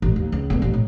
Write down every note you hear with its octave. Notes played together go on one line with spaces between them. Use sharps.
A1
D#2
C#2
D3 B3
A1 G2
A2